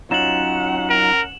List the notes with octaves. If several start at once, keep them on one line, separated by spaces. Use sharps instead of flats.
F#3 C#4 D#4 F4 F#5 E7 F#7
A#4